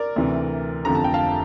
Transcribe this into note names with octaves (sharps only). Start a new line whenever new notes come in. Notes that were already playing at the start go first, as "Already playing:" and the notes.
Already playing: A#4 D5
D2 C3 E3
F1 F2 D3 F3 A#5
A5
G5
F5 A5